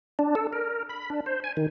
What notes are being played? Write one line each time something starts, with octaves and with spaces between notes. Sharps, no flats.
D4
A4
A#4
B5
D4
C5
G#5
D#3